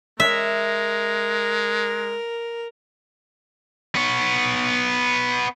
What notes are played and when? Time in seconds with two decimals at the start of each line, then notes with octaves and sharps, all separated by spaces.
0.20 G#3 A#4 E5
3.95 B3 C#5